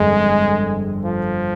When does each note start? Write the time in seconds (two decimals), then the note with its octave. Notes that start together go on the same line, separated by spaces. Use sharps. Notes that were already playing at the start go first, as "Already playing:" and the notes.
Already playing: G1 F2 D3 G#3
1.05 F3